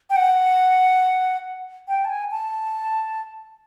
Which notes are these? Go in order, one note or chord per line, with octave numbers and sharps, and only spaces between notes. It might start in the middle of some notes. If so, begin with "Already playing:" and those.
G5
F#5
G5
A5
G#5
A5